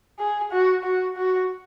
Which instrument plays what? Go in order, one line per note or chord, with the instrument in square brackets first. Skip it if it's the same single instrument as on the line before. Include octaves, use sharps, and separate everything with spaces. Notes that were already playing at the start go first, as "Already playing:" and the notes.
[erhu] G#4
F#4
F#4
F#4